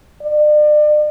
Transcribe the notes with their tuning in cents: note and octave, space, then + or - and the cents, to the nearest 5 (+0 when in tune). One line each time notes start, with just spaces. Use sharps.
D5 +40